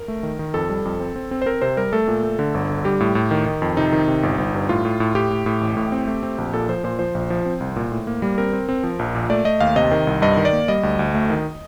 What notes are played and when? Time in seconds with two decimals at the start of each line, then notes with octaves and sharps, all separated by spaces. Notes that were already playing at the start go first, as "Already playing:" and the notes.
Already playing: A#4
0.08 A3
0.23 D#3
0.39 D#3
0.54 F2 A4
0.69 G3
0.85 F2
1.00 C4
1.16 C4
1.31 C4
1.42 C5
1.46 C4 A#4
1.62 C3 C5
1.77 G3 A#4
1.93 A3 A4
2.08 A#2
2.23 A3
2.39 D3
2.54 G1
2.70 D3
2.85 G3 G4
3.00 A2
3.15 A2
3.31 D#3
3.46 D#3
3.62 F2
3.77 C3 D#4
3.92 D#3
4.07 C3
4.23 G1
4.38 G1
4.54 G2
4.69 A2 F4
4.85 A2
5.00 A2
5.15 A2 G4
5.30 A2
5.46 A2
5.61 A1
5.77 A2
5.92 C4
6.07 A3
6.23 C4
6.38 A#1
6.53 A#2 A4
6.69 F3 C5
6.84 A#2 C5
6.99 F3 C5
7.15 A#1
7.30 F3
7.46 C4
7.60 C2
7.76 A#2
7.92 A2
8.07 A#3
8.22 G3
8.38 C4 A#4
8.53 C4
8.69 C4
8.83 F3
8.99 A#1
9.15 A#2
9.30 A3 D5
9.45 A3 D#5
9.60 D#2 F5
9.76 C3 D#5
9.91 D#3
10.07 C2
10.22 G2 D#5
10.37 D#3
10.45 D5
10.53 A#3
10.68 G3 D#5
10.83 D2
10.99 D2
11.14 A3
11.30 D#3